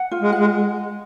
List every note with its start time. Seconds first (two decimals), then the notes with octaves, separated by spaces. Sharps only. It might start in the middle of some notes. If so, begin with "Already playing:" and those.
Already playing: F#5
0.12 F4
0.21 G#3
0.32 F#5
0.38 G#3